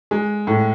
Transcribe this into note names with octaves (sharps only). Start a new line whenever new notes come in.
G#3
A2